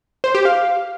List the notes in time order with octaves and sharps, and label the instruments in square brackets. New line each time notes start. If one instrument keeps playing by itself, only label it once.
[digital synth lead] C5
G4
F5